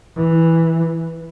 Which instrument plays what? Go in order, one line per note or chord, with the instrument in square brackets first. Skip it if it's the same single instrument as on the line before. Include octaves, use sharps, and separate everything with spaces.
[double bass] E3